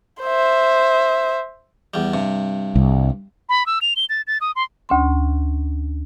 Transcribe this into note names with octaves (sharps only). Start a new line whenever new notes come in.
C5 E5
E2 G3
G2 C3
C2
B5
E6
F7
G7
A6
A6
D#6
C6
D2 C#4 C6